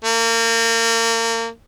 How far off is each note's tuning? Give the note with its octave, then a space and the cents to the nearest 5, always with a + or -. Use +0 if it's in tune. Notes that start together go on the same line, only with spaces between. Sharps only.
A#3 -30